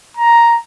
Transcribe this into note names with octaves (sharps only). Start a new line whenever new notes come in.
A#5